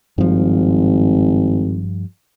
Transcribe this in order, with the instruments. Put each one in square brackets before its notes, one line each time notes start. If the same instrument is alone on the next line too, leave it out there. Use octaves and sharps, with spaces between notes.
[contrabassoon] G#1 [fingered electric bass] G2 F3